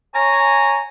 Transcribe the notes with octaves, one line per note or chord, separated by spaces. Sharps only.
C#5 G#5 A#5